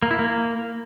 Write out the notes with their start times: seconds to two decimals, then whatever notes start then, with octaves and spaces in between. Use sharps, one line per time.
0.02 A#3
0.11 E4
0.19 A#3